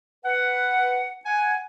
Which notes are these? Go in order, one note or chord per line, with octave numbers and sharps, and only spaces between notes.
B4 F#5
F#5 G#5